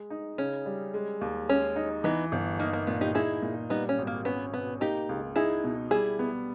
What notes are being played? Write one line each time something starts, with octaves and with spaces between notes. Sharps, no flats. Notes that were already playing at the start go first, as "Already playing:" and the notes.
Already playing: G#3
D#4
C#3 C#4
G3
G#3
D#2
G#3 C#4
D#4
E3 B3 D#4
G1
A#3 D#4
A#3
A#2 B3
D#4 G4
D#4 E4 G#4
A#2
G3 B3 D#4
C#4
G#1
A#3
B3 C#4
B2 B3
A#3 D#4 G4
C#2
D#4 E4 G#4
B2
G3 E4 G#4
B3